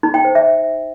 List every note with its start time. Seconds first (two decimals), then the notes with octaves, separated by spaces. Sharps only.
0.03 D#4
0.14 G5
0.25 C5
0.35 E5